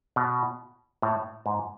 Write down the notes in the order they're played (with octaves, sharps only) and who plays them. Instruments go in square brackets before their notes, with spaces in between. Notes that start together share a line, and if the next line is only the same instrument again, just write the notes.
[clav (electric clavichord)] B2
A2
G#2